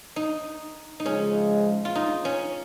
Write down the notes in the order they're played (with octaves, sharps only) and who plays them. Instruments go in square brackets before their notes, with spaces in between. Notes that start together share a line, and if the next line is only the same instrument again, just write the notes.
[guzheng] D#4
D#4
[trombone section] C#3 F3 G#3 [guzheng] C#4
[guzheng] F4
D#4
C#4